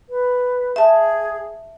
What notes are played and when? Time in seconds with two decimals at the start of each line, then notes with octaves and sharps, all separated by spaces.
0.09 B4
0.76 G#4 E5 A5